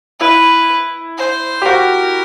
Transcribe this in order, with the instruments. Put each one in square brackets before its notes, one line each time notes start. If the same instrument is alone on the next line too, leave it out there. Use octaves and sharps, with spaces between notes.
[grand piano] E4 [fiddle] B4
[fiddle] C5
[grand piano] G4
[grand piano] F#4 [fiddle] A#4